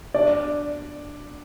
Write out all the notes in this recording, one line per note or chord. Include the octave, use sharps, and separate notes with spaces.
D4 D5